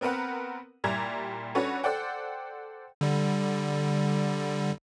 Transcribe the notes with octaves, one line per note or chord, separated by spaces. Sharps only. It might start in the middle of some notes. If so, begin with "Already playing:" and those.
B3 C4 A#4 B4 F#5
A#2 G3 E4 A#5 G#6
C#4 D4 F#4 A4 B4 C#5
A4 C5 D5 F#5 G5
D3 G3